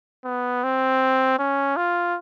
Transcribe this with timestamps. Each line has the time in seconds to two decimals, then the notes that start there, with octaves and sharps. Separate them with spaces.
0.25 B3
0.64 C4
1.39 C#4
1.77 F4